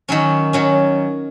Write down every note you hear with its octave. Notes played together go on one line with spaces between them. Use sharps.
D#3 F#3 C#4
D#3 F#3 C#4